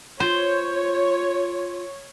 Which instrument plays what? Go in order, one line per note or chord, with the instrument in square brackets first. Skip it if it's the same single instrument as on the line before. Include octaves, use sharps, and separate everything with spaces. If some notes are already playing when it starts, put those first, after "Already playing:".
[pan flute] F4 [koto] C5 [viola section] C#5